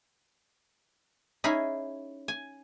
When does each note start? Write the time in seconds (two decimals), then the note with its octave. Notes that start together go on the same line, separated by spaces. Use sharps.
1.44 C#4 D#4 E4 G#4
2.28 G#5